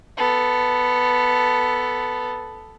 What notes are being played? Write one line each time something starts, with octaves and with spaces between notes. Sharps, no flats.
B3 A4